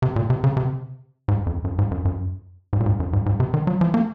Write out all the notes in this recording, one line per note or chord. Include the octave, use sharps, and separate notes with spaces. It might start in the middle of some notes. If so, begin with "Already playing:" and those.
C3
A#2
C3
C#3
C3
G#2
F2
F#2
G#2
F#2
F#2
G#2
A#2
G#2
F#2
G#2
G#2
C3
D#3
F#3
F3
A#3